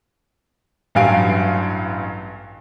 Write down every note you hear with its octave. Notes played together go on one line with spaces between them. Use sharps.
A1 G2 F#3 F5 G#5 D7